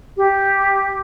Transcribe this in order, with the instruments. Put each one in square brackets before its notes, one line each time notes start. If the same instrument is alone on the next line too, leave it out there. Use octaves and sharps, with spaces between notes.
[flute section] G4